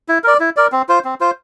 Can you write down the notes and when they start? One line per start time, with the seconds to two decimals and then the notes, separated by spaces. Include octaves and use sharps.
0.08 E4
0.24 A#4 D5
0.40 E4
0.56 A#4 D5
0.72 C4
0.89 F4 C5
1.04 C4
1.21 F4 C5